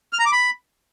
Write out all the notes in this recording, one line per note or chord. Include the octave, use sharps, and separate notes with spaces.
F6
A#5
D6
B5